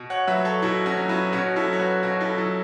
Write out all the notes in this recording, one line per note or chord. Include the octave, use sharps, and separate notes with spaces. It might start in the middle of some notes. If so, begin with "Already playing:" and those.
Already playing: B2
C#5 F#5
F#3 B4 E5
A4 C#5
B2 E4 A4
C#4 F#4
F#3
B3 E4
B2 C#4 F#4
E4 A4
F#3
C#5
F#4 B4
B2 C#4 F#4
E4 A4
F#3 E4 A4